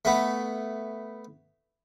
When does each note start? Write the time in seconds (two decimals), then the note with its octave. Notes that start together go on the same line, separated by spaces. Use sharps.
0.05 A3 B3